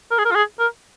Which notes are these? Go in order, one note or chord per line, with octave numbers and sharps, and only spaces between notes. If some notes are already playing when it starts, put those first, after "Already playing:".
A#4
G#4
A#4
F4
G#4
A#4